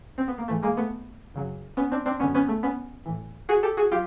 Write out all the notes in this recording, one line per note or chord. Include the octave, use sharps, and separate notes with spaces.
C4
B3
A#3
G#2 E3 A3
G#3 A#3
A3 B3
F#2 C#3 F#3
B3 C#4
C4 D4
C4 D4
F#2 D3 F#3 B3 C#4
B3 C#4
A3
B3 C#4
A2 E3
F#4 G#4
G4 A4
F#4 G#4
F#3 F4 G4